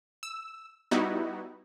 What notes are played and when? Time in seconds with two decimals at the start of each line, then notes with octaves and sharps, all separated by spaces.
0.23 E6
0.91 G3 B3 D#4 E4 F#4